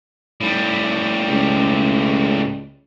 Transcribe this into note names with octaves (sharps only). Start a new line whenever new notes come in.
A2 G3
C#2